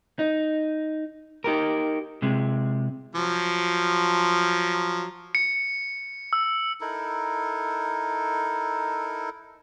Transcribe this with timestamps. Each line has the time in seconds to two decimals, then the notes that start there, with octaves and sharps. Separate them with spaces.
0.19 D#4
1.44 D#4 G4 A#4
2.22 C3 G#3
3.15 F3 F#3
5.35 C#7
6.33 E6
6.81 D#4 E4 A4 A#4